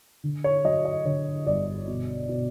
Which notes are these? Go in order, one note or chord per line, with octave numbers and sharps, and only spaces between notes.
D3
C#5
F#3 D#5
D#5
D3 C#5
G1 D5
B2
B2